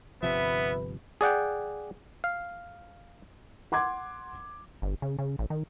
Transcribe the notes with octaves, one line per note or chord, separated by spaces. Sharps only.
G1 C3 F3 B3 B4 E5
G#4 D5 F#5 G5
F5
F#5 C6 D6 G#6
G1
C#3
C#3
A1
D#3